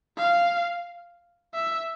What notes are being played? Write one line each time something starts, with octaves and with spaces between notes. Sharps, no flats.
F5
E5